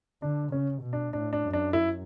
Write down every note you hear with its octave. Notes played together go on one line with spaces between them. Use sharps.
D3 D4
C#3 C#4
B2
D4
A2 D4
D4
F#2
D4
E4